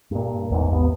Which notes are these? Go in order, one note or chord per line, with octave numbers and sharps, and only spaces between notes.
G2 A#2
A1 E2 G#2
D#2 A3 B3